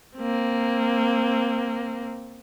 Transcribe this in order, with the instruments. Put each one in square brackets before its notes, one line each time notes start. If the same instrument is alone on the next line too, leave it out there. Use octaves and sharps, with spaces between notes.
[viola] A#3 C4